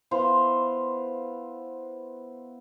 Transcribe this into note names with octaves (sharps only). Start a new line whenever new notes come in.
B3 E4 C5 F5